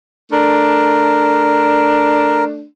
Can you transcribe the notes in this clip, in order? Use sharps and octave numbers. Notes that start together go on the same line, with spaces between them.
A3 D4 A#4